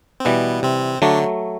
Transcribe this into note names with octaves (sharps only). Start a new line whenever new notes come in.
C4
B2 E3 G3 B3
C3 C4
D3 F#3 A3 D4